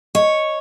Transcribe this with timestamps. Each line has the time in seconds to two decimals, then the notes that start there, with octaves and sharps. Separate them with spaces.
0.15 C#5 D#5